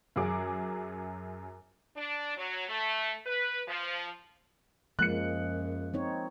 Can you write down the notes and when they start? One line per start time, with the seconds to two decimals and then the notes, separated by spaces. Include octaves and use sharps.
0.16 F#2 F#3 G#4 D6
1.97 D4
2.36 F#3
2.68 A3
3.26 B4
3.67 F3
4.99 F#2 F3 G#3 A#3 F#6 C#7
5.94 C4 D#4 C#5